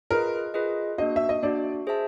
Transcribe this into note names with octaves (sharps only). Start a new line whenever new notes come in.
F4 G#4 A#4 B4 D#5
F4 G#4 B4 D#5
A#3 D4 F#4 D#5
E5
D#5
A#3 D4 F#4 D5
G#4 C5 E5 A5